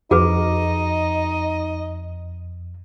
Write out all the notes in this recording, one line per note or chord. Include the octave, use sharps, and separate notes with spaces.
F2 D#4 F#4 G#4 B4 D#5